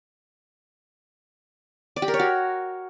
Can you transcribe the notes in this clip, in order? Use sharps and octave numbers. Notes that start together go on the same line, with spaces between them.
D5
G4
A#4
C#5
F#4